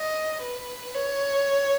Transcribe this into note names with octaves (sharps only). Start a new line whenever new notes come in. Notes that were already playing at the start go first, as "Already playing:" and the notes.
Already playing: D#5
B4
C#5